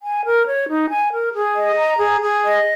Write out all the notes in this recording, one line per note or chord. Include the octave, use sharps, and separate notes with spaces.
G#5
A#4
C#5
D#4
G#5
A#4
G#4
D#5
A#5
G#4
G#4
D#5